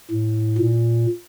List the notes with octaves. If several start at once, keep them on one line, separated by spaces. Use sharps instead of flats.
A2
A#2